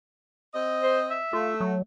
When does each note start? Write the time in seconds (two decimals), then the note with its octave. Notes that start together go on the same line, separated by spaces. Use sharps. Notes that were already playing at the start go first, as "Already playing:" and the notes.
0.54 C4 D#5
0.83 C5
1.10 E5
1.33 A3 F4
1.60 F#3